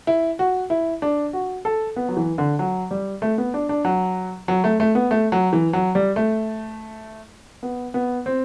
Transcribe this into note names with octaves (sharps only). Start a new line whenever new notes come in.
E4
F#4
E4
D4
F#4
A4
B3
F#3
E3
D3
F#3
G3
A3
B3
D4
D4
F#3
F#3
A3
A3
B3
A3
F#3
E3
F#3
G3
A3
B3
B3
C4